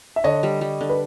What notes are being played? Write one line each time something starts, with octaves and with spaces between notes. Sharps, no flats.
E5
D3 C#5 D#5
G3
G3
D3
B4